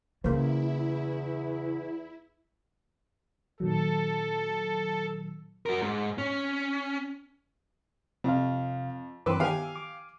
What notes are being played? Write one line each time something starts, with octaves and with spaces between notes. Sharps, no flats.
E2 C#3 A#3 E4 C5
A#2 D#3 F#3 A4
F#4 A#4
G#2
C#4
F2 C3 F5
G2 E3 C4 B4 C6 D6 E6
D#3 B3 G4 F5 G5 G#5
D6